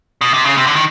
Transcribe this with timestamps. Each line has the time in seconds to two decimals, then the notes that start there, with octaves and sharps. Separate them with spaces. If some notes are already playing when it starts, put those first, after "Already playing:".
0.21 B2
0.34 C3
0.45 C#3
0.58 C3
0.67 D3
0.76 D#3